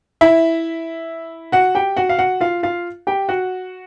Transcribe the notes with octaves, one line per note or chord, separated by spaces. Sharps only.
E4 E5
F#4 F#5
G4 G5
F#4 F#5
F5
F#4 F#5
F4 F5
F4 F5
G4 G5
F#4 F#5